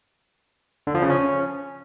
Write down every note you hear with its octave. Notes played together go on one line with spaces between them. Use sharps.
D3
F3
C#3
C#4